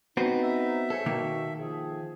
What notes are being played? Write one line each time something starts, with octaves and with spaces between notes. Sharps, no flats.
B3 C4 D#4 F#4 B4
E5
G#4 A4 C5 C#5
B2 D#3 A#3
F3 G#4